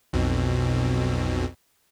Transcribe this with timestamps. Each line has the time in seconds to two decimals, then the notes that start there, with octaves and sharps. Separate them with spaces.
0.13 B1 F2 B2